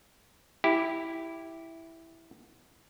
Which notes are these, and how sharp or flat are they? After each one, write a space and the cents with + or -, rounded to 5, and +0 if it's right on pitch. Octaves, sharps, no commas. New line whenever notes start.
E4 +0 G4 +0